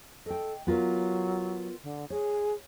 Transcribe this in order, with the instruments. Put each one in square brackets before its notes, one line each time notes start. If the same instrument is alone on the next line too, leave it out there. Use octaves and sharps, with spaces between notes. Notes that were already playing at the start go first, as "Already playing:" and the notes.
[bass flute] A4 [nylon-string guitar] D#5 G5
[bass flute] F#3 [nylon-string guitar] B3 F4 A#4
[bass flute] D3
[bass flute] G#4 [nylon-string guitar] C#5